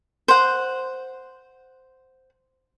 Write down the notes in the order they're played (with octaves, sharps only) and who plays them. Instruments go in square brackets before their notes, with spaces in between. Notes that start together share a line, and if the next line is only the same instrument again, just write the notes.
[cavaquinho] C5 F#5